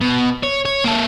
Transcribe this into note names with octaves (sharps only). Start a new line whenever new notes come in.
B2
C#5
C#5
A#3 A4